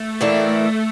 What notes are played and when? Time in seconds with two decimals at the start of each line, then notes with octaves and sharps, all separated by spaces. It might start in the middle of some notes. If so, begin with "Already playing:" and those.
Already playing: A3
0.21 A2 E3 A#3 D4